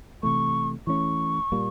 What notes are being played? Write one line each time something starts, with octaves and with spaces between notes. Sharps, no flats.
C3 E3 A3 C#6
E3 A3 C#4 C#6
A#2 G3 A#3